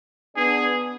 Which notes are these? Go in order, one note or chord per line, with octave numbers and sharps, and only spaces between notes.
B3 D4 G#4